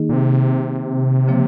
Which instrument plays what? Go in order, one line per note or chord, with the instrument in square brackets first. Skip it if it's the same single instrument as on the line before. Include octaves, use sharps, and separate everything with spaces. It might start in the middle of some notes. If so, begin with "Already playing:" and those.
Already playing: [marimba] D#3 A#3 D#4 G#4
[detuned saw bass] A#2
C3
[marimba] C#3 F3 A#3